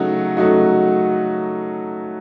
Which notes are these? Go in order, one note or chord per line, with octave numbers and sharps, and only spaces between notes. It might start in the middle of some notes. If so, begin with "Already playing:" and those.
Already playing: C#3 F#3 A3 D#4 F#4
C#3 F#3 A3 D#4 F#4